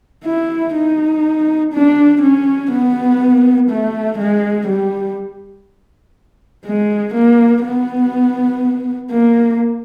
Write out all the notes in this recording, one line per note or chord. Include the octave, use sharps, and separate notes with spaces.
E4
D#4
D4
C#4
B3
A3
G#3
G3
G#3
A#3
B3
A#3